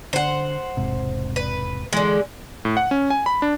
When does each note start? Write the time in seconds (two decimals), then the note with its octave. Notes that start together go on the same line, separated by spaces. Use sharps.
0.13 D3 C5 F#5
0.77 E1 G#2 C3
1.36 B4
1.93 D3 E3 G#3
2.65 A2
2.77 F#5
2.91 C#4
3.10 G#5
3.26 B5
3.42 D4